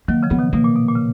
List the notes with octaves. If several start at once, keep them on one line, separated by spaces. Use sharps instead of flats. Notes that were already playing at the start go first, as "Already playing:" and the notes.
D#3 F#3 A#3
C#3 F3
B3
B2 D#3
B2 A#3
A#2
B2
A#2
C#3